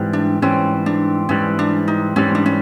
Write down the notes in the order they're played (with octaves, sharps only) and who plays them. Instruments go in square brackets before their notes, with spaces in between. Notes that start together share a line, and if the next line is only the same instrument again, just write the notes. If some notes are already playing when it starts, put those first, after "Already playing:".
Already playing: [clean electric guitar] G#2 E3 G3 C4
[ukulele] D4
[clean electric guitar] G#2 E3 G3 C4 [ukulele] C#4
[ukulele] D4
[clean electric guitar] G#2 E3 G3 C4 [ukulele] C#4
[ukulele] D4
D#4
[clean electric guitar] G#2 E3 G3 C4 [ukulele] C#4
[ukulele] D4
C#4